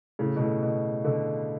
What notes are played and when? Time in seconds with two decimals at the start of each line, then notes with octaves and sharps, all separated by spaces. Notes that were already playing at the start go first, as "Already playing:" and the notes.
0.19 A2 C#3
0.36 B2
0.41 A2
0.63 B2
1.04 B2 D3